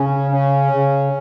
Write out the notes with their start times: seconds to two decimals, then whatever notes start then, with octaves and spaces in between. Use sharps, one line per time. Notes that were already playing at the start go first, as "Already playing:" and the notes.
Already playing: C#3 C#4
0.31 C#4
0.72 C#3